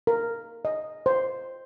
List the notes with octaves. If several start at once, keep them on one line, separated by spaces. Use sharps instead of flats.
A#4
D#5
C5